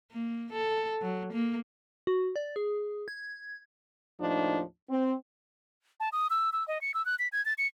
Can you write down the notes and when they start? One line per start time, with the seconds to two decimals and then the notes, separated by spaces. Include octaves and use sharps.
0.11 A#3
0.52 A4
1.02 F#3
1.32 A#3
2.07 F#4
2.36 D5
2.56 G#4
3.08 G#6
4.20 D#2 A2 F3 D4 D#4
4.90 C4
6.00 A5
6.12 D#6
6.30 E6
6.53 E6
6.68 D#5
6.81 C#7
6.94 E6
7.06 F#6
7.19 B6
7.32 G#6
7.45 A6
7.58 C#7